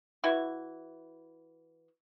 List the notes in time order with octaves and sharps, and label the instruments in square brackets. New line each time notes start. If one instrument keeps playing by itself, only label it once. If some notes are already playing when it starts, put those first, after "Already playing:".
[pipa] E3 E4 F#4 C#6